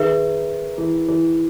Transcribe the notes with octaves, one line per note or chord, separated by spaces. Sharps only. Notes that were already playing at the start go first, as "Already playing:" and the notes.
Already playing: D#3 G#4 B4 E5
E3
E3